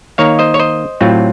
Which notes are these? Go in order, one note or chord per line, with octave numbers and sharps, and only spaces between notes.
D#3 A#3 D#4 C#5 F5
C5 D#5
C#5
C5 D#5
A2 F#3 C4 F4